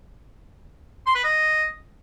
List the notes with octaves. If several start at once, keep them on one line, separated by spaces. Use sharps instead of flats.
C6
B4
D#5